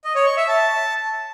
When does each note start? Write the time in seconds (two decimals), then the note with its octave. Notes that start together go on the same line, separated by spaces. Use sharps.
0.04 D#5
0.15 C#5
0.26 C#6
0.37 E5
0.48 A5